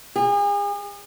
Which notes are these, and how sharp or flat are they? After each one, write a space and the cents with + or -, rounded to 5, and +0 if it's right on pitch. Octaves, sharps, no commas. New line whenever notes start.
G#4 -40